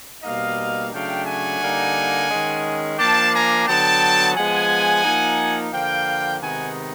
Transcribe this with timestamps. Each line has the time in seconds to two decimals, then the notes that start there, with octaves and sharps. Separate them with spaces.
0.23 B2 G3 A#3 D#4 D#5 F5
0.92 C#3 F#3 A3 D4 F5 G5
1.26 F#5 G#5
1.60 D3 G3 A#3 D#4
2.30 D#3 G#3 C#4
2.98 F3 A#3 D4 G5 A5
3.32 G#5 A#5
3.67 D3 F#3 B3 G5 A5
4.35 F3 G#3 B3 F#5 G#5
5.05 F3 A#3 D#4
5.73 D3 F3 A#3 F5 G5
6.41 C3 D#3 G#3 B3 D#4 F#5 G#5